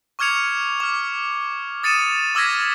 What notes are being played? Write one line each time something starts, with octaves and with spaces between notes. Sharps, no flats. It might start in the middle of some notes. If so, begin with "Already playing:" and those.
C#6 D6 F6 G#6 C#7 F7
D6 F6
D#6 A6 C#7 D#7 E7
D6 E6 F6 G#6 A#6 B6